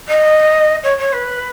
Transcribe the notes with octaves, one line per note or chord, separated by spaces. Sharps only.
D#5
C#5
C#5
B4